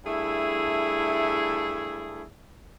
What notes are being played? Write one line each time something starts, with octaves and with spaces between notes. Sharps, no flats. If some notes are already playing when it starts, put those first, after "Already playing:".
G2 A3 E4 G#4